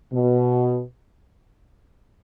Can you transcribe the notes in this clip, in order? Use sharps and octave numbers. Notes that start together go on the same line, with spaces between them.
B2